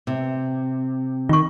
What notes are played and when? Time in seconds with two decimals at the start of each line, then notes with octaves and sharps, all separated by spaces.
0.07 C3
1.29 D#3 F4 C#6